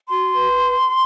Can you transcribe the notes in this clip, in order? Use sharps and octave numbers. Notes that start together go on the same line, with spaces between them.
F#4 C6
B4